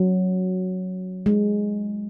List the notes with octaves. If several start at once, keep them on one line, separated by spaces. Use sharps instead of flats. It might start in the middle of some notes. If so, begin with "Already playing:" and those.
Already playing: F#3
G#3